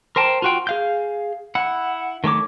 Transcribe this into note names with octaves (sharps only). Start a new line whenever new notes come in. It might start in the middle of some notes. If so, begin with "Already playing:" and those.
A#4 C5 G5 A5
F4 F#4 G5
G#4 F5 G6
E4 F#5
D#3 A3 C#5 D6